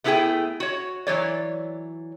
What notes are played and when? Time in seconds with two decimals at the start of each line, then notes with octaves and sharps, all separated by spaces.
0.04 A3 B3 E4 F#4 G#4 G5
0.60 F#4 C#5
1.07 E3 F#3 C#5 D5